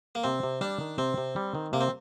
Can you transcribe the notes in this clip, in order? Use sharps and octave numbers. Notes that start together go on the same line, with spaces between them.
A#3
C3 C4
C3
G3 D4
D#3
C3 C4
C3
G3
D#3
C3 A#3
C4